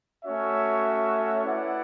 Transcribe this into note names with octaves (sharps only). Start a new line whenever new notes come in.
A3 C#4 F#4 C#5 E5
E4 B4 D5 F#5